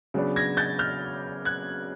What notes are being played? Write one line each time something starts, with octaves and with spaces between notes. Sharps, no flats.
C#3 F#3 B3 D4
G#6 A#6
G6 A6
F6 G6
F#6 G#6